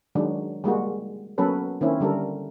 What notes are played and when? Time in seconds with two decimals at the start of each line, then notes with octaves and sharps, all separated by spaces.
0.15 D#3 F#3 G#3 D4
0.64 G3 G#3 A#3 F#4
1.38 F#3 A#3 B3 C#4 A4 B4
1.81 D#3 A#3 C4 C#4 E4
2.00 D3 G3 A4 A#4